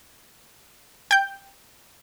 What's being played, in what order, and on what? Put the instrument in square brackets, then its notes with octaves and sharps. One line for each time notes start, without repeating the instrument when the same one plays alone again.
[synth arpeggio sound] G5 G6